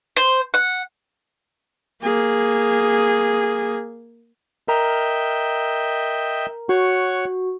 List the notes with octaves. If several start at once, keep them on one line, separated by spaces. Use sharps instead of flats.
C5
F#5
A#3 G#4
A#4 D#5 E5 G5 A#5
F#4 C#5 F#5 C#6